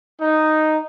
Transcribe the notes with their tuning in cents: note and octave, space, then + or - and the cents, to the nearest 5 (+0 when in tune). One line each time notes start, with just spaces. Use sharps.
D#4 -5